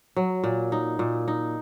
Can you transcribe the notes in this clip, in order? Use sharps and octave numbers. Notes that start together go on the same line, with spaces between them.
F#3
A#2
D#4
A#2
D#4